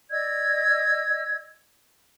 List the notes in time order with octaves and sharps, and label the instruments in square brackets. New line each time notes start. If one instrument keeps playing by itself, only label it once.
[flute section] D5 D#5 E6 G#6